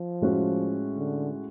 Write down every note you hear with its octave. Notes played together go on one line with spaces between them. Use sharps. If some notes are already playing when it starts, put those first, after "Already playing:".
Already playing: F3
A2 G#3 C#4 F#4
D3